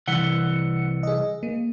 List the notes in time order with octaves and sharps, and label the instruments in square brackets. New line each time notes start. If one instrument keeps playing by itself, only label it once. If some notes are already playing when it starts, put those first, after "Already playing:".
[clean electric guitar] C2 E3 [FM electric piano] F#5 C#7
[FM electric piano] G#4 D#5
A#3